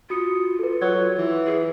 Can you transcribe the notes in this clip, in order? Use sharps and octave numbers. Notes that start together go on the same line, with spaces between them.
F4 F#4 D#6 C#7
A4 B4
F#3 G#6
E3
G#4